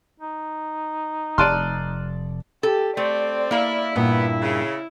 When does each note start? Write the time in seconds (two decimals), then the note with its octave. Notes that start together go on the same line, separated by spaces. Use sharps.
0.20 D#4
1.38 F1 D5 A5 C6 F6 F#6 D#7
2.63 G4 A4
2.97 A3 C4 D5
3.51 A#3 E4 F5
3.96 G2 A#2 B3 E4
4.42 C#3